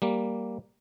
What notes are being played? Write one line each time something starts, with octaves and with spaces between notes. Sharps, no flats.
G3 A#3